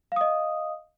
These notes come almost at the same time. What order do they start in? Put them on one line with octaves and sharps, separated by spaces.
F5 D#6 D#5